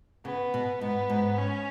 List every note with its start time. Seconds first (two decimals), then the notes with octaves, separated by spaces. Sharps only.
0.25 C#3 B3
0.54 B2
0.81 G#2 B3
1.10 G#2
1.38 C#4